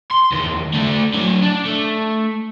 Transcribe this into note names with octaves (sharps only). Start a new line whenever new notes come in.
C6
E2 D#3
A3 D4
D3 F#3
D4
A3